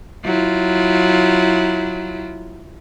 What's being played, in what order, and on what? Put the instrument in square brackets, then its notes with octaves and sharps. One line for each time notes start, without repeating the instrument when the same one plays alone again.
[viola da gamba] F#3 E4 F4